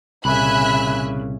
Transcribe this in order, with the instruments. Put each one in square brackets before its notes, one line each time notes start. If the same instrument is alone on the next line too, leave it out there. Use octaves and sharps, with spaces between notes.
[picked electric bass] C2 [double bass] A#2 C#3 [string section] E5 G#5 F#6 [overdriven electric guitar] B5